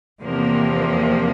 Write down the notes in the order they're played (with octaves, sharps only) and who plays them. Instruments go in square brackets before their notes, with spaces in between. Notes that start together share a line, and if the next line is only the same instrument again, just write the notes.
[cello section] E2 C3 F3 A#3